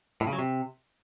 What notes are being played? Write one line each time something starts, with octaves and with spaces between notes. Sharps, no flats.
A2
C#3
F#3
C3